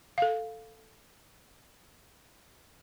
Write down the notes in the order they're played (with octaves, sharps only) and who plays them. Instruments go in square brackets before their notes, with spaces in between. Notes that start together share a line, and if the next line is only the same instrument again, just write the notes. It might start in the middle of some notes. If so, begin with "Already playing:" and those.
[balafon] A4 F5